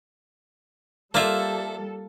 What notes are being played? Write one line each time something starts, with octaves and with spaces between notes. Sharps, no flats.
G3 A#3 F4 A4 C5 D5 E5